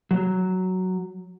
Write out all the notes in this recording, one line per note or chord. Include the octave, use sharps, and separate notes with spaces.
F#3